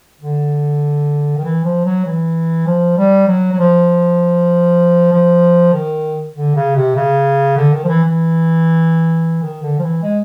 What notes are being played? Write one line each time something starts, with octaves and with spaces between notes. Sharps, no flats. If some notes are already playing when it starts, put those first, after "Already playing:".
D3
D#3
E3
F3
F#3
E3
F3
G3
F#3
F#3
F3
F3
D#3
D3
C#3
C3
C#3
D3
D#3
F3
E3
E3
D#3
D3
F3
E3
G#3